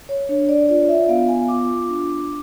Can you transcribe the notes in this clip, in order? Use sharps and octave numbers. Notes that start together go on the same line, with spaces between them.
C#5
D4 C#5
D5
F4 D5
E5
B3 F5
G#5
F4 D6
D4